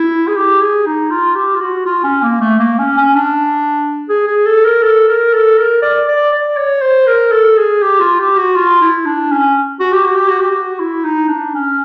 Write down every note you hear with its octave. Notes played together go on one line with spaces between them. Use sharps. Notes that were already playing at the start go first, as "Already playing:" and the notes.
Already playing: E4
G#4
G4
G#4
D#4
F4
G4
F4
F#4
F4
C#4
A#3
A3
A#3
C#4
C#4
D4
G#4
G#4
A4
A#4
A4
A#4
A4
A#4
D5
D5
D5
C#5
C5
A#4
A4
G#4
G4
F4
G4
F#4
F4
E4
D4
C#4
F#4
G4
F#4
G4
F#4
G4
F#4
E4
D#4
D4
C#4